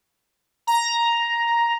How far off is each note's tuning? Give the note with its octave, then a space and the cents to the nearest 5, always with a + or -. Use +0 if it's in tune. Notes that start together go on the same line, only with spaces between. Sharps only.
A#5 +5